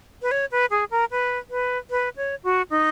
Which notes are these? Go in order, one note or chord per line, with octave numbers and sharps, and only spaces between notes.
B4
C#5
B4
G#4
A#4
B4
B4
B4
C#5
F#4
D#4